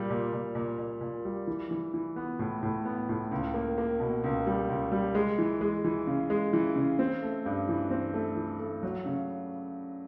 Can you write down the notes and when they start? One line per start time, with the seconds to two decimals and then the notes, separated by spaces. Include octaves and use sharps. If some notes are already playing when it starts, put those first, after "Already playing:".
Already playing: A#2 G3
0.10 A#2
0.33 A#2
0.55 A#2
0.78 A#2
1.01 A#2
1.25 G3
1.47 E3
1.71 E3
1.94 E3
2.16 B3
2.39 A2
2.63 A2
2.85 B3
3.09 A2
3.32 C#2
3.54 A#3
3.78 A#3
4.00 B2
4.24 C#2
4.46 G3
4.69 C#2
4.92 G3
5.15 G#3
5.38 E3
5.61 G#3
5.84 E3
6.07 C#3
6.30 G#3
6.53 E3
6.76 C#3
6.99 C4
7.22 A3
7.46 G2
7.69 E3
7.90 C4
8.14 A3
8.37 E3
8.59 A3
8.83 F#3
9.06 C#3